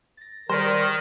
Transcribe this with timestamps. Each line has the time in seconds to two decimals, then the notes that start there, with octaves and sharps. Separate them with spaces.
0.17 A6 A#6
0.49 D#3 G3 A#4 C5 D5